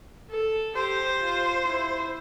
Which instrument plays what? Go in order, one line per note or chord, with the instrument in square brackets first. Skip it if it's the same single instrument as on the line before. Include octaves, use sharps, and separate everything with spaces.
[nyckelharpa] A4
[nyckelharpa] G4 [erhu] C5
[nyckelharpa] F4
E4